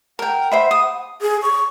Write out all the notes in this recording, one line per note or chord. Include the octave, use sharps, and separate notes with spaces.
A#4 F#5 G5
C5 E5 B5
D#6
G#4
C#6